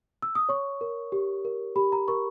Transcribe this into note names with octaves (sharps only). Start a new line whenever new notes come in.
E6
D#6
C#5 C#6
A#4
G4
A#4
G4 B5
A#5
A#4 C#6